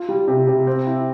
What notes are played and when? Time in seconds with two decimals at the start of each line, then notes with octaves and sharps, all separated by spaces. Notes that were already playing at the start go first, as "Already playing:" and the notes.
Already playing: F4
0.09 G3
0.28 C3
0.47 C3
0.67 C4
0.86 E4